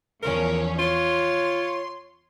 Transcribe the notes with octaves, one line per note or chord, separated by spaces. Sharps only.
E2 F3 C#4 A#4
F4 C#5 C6